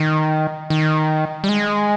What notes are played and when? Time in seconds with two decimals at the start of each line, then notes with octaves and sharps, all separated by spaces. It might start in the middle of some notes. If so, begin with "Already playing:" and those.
Already playing: D#3
0.70 D#3
1.44 G3
1.49 G#3